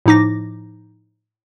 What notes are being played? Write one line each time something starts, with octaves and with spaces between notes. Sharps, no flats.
A2 F3 D#4 D6 A#6